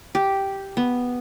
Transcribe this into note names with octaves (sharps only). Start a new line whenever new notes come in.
G4
B3